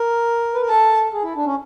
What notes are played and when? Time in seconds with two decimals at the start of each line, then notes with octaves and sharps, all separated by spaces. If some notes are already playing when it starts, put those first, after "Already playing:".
Already playing: A#4
0.54 B4
0.62 A#4
0.69 A4 A5
1.13 G#4
1.23 E4
1.36 D4
1.46 C#4